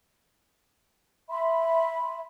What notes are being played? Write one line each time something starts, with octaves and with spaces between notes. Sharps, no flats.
E5 B5 C6